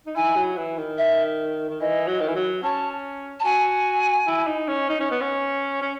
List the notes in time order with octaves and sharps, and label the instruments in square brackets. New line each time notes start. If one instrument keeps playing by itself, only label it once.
[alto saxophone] D#4
[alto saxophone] E4 [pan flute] G#5
[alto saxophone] F#3
E3
D#3
[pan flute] E5
[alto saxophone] D#3
[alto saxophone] E3 [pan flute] D#5
[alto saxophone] F#3
D#3
E3
F#3
[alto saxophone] C#4 [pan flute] A5
[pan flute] A5
[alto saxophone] F#4 [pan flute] G#5
[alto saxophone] E4
D#4
C#4
D#4
C#4
B3
C#4
C#4